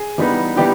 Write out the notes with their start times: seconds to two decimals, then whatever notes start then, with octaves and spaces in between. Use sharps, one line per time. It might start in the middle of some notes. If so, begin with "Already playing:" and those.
Already playing: G#4
0.18 E3 G3 B3 D#4
0.57 E3 G3 B3 D#4 G4